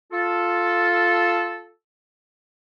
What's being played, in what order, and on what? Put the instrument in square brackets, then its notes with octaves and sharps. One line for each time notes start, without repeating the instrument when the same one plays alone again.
[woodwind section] F4 A4